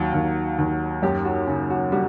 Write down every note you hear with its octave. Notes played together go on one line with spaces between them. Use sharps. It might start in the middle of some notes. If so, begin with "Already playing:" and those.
Already playing: D#2 F#3
D#2
D#2
F#2 G4
F#4
C#3
F#4
G3 F#4